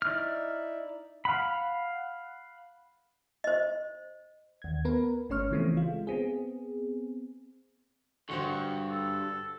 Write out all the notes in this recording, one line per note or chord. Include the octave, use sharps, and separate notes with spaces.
D#4 E4 D5 E5 F6
F5 F#5 B5
C5 D#5
D#2 G#6
B3 A#4 B4
G1 A3 C#4 C#5 C#6 F6
C#3 E3 F3 A3 B3 C4
G#3 F4
B3 C4 G#4
E2 G2 D3 F#4 C5 C#6
A4